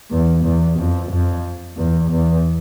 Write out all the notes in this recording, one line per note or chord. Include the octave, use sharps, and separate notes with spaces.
E2
E2
F2
F2
E2
E2